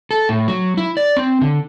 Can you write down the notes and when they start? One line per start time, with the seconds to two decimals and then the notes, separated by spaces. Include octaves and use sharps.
0.11 A4
0.29 A2
0.48 F#3
0.77 E4
0.97 D5
1.17 C4
1.41 D3